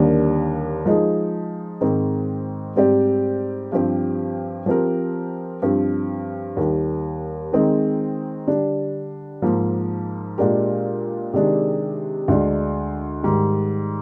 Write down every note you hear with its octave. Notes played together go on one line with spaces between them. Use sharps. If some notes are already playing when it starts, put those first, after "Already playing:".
Already playing: D#2 D3 G3 A#3 D4
F3 G#3 D#4 G#4
G#2 D#3 G#3 C4
G#2 G3 C4 G4 D5
G2 F3 C4 G4
F3 C4 G4 A#4
G2 F3 C4
D#2 D#3 G3
D#3 G#3 C4 D#4 G#4
D3 G3 D4
G#2 F3 A#3
A#2 G#3 D4 G4 A#4
C3 D#3 G#3 D4 G#4
D2 D3 G#3 D4
G#2 D#3 G3